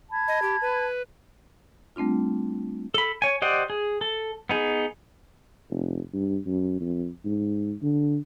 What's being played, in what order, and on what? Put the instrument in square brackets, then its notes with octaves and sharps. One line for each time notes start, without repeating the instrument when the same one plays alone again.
[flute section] A5 B5 G#6
[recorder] D#5
G4
B4
[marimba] G3 A3 C4 D4 F4
[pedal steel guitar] A4 B5
C#5 G#5
G4 C5 D5 D#5 F#5
G#4
A4
B3 D#4 G#4
[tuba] F1
G2
F#2
F2
G#2
D3